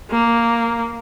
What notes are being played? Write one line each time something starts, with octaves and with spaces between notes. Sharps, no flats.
A#3